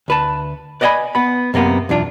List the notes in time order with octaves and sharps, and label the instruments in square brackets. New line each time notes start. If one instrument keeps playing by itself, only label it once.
[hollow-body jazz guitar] D2 B4 A5
B4 D5 D#5 F5 G#5 B5
B3 B5
F#2 C3 A#3 B3
B1 E2 D4 F4